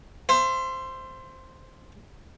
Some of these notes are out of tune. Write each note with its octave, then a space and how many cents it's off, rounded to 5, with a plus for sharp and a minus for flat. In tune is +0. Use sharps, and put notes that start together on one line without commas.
C5 +0 E5 +35